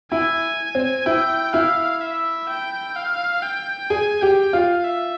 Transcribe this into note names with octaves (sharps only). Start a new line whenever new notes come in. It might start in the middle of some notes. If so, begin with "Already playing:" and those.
E4 G#5
C4
E4 G5
E4 F5
E5
G5
F5
G5
G#4 G#5
G4 G5
F4 F5
E5